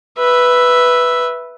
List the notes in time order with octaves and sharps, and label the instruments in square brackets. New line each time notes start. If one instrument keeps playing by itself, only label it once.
[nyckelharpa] B4 E5